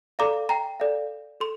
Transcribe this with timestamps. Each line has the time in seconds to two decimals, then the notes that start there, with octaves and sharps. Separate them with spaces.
0.19 A4 D5 F5 A#5 D6
0.49 G5 A#5
0.80 A4 D5 F5
1.40 A4 C6